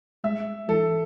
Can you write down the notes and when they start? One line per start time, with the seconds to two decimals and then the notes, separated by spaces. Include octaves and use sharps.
0.24 G#3 E5
0.69 E3 A4